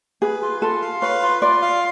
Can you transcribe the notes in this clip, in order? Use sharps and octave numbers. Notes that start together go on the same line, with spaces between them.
G#4 B4
F4
F4 A4
F5
B4 C#5
F4
F4 D5
F5